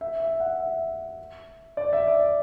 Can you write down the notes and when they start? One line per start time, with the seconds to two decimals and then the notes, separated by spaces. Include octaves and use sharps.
0.01 E5
0.20 E5
0.40 F#5
0.60 E5
1.77 D5
1.93 E5
2.08 D5